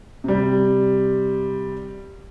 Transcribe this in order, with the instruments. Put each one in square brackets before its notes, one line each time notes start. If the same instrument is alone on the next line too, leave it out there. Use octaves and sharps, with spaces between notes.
[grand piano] C3 G3